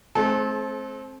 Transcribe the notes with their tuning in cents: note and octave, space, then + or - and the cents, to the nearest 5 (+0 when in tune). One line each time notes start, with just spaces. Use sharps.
A3 -45 C4 +20 A4 -25